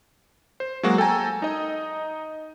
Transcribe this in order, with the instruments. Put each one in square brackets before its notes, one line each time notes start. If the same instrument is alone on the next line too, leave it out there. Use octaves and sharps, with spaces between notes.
[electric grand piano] C5
F#3 G#3 A#3 F#4
A4 G5 G#5 A#5
D#4 D#5